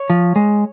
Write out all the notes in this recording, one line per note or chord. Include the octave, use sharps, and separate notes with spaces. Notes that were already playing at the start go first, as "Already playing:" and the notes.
Already playing: C#5
F3
G#3